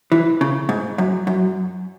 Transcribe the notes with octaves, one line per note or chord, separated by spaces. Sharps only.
E3
C#3
G#2
F#2
F#2